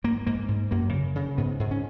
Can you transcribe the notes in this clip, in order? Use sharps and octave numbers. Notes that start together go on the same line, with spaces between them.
G#2 A#3
G#2 A#3
G#2
F#2 A#3
C#3
C#3
G#2 B3
G#2
C#4